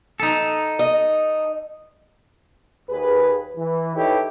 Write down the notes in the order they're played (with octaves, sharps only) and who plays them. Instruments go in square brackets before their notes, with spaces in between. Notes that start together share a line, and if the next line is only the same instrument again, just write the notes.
[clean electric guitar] D#4 A4
[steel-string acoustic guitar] D#5
[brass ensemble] D#2 G#4 B4
E3
D#4 E4 G4 A4 B4 C#5